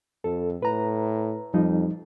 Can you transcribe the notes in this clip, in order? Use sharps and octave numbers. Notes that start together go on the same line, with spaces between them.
F2 A4
A2 B4 A#5
F2 F3 G3 D#4